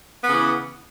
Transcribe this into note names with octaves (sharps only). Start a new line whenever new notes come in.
C#3 E3 B3